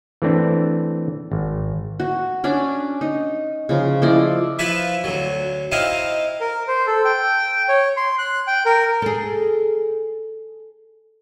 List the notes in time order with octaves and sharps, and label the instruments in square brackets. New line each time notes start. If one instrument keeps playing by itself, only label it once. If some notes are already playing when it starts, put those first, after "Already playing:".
[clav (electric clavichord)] E3 A3 C4 D4
G#1
[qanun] F#4
C#4 D4 D5
D#4
C#3 F3
F3 E4 D5 D#5
[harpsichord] F3 E4 B4 E5
D2 F#3
C4 D#4 E4 F5
[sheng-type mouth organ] A#4
C5
A4
G5
C#5
C6
F#6
G5
A#4
[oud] G#4 A4